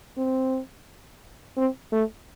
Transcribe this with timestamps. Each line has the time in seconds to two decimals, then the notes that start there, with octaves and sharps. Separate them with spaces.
0.18 C4
1.57 C4
1.92 A3